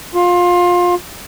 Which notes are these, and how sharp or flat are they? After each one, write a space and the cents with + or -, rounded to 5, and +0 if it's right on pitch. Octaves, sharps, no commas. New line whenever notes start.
F4 +20